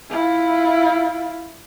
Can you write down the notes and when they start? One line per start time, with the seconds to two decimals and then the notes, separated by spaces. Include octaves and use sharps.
0.10 E4 F4